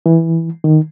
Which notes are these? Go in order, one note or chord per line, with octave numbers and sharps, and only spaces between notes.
E3
D#3